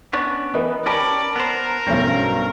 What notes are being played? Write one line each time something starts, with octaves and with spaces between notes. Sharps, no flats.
B3 C#4 D4
E3 B3 A#4 B4 D#5
C#4 G4 A#4 D5 A5 B5 D7
B3 A#4 C5
B1 G2 C4 C#4 A#6